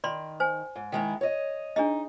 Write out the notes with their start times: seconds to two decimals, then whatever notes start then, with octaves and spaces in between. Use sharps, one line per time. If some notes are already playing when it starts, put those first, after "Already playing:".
0.04 D#3 D5 B5 C6
0.40 C5 G#5
0.76 G#2
0.92 D#3 G#3 E4
1.21 C#5 D#5
1.76 D4 D#4 G#4 D#5